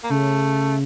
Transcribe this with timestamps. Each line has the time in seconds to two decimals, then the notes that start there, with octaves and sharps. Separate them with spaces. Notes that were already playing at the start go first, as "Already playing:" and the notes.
0.04 A#3
0.10 C#3 A3